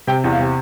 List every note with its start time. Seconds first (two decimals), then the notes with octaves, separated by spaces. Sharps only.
0.07 C3 G5
0.24 E2
0.32 F5
0.39 C3